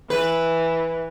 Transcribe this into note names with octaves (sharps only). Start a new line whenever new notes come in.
E3 B4